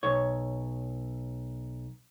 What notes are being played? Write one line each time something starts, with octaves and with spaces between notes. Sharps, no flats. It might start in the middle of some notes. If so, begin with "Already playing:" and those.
B1 C#5